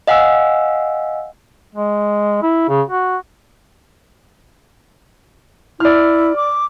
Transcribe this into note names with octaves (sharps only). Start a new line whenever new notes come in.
D#5 F5 F#5 G#5 E6
G#3
E4
C#3
F#4
E4 D5 F6
D6